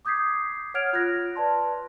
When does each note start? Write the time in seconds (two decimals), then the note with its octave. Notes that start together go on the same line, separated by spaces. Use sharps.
0.05 D6 D#6 G6 G#6 B6 C7
0.74 C#5 F#5 F6 G#6 D7 F7
0.93 F4 F#6 G#6 A#6
1.36 B4 D5 A5 C6